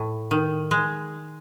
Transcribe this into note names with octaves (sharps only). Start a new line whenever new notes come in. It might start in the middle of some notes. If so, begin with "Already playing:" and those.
Already playing: A2
D#3
G#3